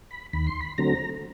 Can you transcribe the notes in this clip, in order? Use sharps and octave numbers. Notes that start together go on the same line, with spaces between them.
B5
D#2 B5
C6
B5
D3 F#3 A3 C4 A#5